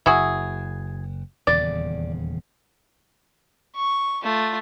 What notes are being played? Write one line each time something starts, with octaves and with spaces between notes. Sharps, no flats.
F#1 E4 F#4 G#4
D#1 E2 C#3 D5
C#6
A3 F4